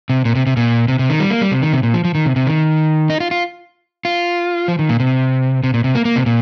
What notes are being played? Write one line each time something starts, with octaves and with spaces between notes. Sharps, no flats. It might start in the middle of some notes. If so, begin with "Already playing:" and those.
C3
A#2
C3
C3
A#2
C3
C3
D#3
G3
A#3
G3
C3
D#3
C3
A#2
F3
F3
D#3
C3
C3
D#3
D#4
F4
F4
F4
F3
D#3
A#2
C3
C3
A#2
C3
A#3
A#3
C3
A#2